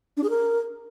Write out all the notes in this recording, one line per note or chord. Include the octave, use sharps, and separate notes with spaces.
D4
G#4
A#4